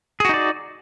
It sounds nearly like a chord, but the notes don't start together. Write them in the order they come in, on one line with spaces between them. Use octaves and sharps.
G#4 F#4 D#4 D5